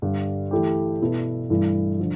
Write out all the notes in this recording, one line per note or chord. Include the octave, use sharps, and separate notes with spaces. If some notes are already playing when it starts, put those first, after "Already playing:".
G2 D3 G3
E3 A3 E4 G4
B2 B3 E4 A4
G2 E3 A3 E4
D3 F3